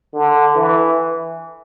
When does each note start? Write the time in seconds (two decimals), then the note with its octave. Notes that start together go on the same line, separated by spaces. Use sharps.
0.14 D3
0.55 E3